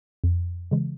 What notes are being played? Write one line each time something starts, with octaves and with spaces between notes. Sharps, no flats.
F2
C#3 E3 G#3